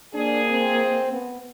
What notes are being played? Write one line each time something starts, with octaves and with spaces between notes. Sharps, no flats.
F2 A#3 D4 G#4
C4
B3